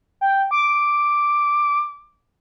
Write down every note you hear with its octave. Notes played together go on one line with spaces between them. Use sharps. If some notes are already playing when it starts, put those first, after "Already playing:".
G5
D6